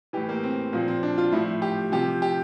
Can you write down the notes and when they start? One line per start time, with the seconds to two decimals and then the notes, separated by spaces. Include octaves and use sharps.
0.13 A2 E3 G4
0.29 A#3
0.43 C4
0.73 A#2 F3 C4
0.88 C4
1.03 D4
1.18 F4
1.32 A2 F3 E4
1.62 G4
1.92 C3 F3 G4
2.22 G4